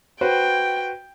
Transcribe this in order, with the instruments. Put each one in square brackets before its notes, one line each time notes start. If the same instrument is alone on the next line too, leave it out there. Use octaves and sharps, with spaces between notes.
[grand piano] F#4 B4 C5 [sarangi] G5